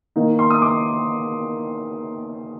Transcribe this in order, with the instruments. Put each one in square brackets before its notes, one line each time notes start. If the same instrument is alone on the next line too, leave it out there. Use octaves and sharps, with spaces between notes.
[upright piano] D#3 A#3 D#4
C6
D#6
D6